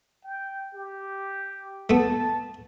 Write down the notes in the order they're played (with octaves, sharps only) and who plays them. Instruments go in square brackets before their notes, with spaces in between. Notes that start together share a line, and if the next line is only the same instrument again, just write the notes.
[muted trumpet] G5
G4
[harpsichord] A3 B3 [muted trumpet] A5